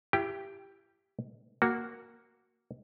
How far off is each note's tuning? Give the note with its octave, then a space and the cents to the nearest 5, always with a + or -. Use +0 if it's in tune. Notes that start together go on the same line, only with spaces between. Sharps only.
E4 +40 G4 +5 G5 +0
A#3 +0 F#4 +0